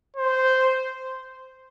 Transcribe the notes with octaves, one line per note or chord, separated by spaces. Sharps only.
C5